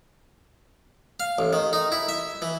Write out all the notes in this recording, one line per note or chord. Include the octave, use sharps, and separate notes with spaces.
F5
A1
D#3
D#4
E4
E5
E3